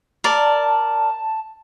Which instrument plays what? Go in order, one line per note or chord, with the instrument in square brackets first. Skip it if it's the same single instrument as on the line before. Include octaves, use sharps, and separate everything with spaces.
[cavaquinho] A#4 D5 [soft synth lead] A5